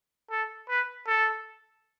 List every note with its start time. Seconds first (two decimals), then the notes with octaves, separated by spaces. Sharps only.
0.31 A4
0.69 B4
1.08 A4